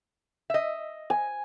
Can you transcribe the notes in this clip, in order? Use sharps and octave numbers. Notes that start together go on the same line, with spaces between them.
D#5 E5
G#5